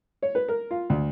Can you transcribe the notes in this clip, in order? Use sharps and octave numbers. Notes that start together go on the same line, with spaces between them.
C#5
B4
A#4
F4
D2